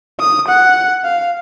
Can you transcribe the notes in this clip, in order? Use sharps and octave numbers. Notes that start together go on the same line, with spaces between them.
D#6
F#5
F5